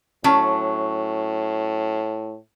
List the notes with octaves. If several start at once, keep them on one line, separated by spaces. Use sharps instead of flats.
A2 F#3 C#4 A5